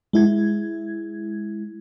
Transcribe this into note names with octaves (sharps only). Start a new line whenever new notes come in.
G#3 E4 G#6